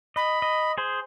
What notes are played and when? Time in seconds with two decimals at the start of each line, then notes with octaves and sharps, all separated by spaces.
0.16 D#5 B5
0.42 D#5
0.78 G#4 C5